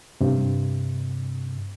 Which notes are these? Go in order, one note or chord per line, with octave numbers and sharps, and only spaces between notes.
G2 C3